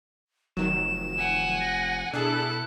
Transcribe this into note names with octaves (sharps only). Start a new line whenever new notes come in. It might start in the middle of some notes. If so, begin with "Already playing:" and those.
F1 D#3 F#3 E7
F#5 G#5
A#6
B2 D4 E4 G#4 A4 F#6